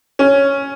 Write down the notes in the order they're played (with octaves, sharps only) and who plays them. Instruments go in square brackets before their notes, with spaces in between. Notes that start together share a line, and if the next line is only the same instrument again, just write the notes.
[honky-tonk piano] C#4